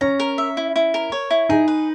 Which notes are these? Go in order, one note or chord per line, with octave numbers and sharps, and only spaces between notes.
C#4 A#5
A#4
E5
E4
E4
A#4
C#5
E4
D#4 G#4
B4